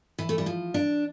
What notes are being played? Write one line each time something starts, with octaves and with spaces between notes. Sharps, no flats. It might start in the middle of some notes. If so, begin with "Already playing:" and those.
E3
A3
G3
F3
D4